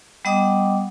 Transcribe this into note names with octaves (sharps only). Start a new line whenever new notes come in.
G3 B3 D#5 F#5 D6 D#6